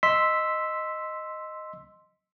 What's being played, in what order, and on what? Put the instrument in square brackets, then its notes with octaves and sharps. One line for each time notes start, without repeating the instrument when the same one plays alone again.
[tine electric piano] D#5 C6 E6 B6